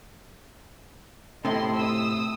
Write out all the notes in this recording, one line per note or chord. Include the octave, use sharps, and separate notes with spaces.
A2 C3 E4 D#5 C6
D#6 E6